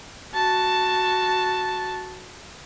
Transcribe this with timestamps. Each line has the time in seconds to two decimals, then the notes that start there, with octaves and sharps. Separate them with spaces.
0.33 F#4 A5